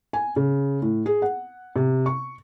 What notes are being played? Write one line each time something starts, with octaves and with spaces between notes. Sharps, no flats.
G#5
C#3
A2
G#4
F#5
C3
C#6